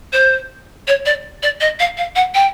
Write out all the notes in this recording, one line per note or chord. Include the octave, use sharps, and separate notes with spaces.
C5
C#5
D5
D5
D#5
F5
F5
F#5
G5